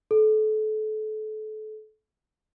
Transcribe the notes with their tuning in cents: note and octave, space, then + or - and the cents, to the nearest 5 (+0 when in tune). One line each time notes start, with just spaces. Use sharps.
A4 -30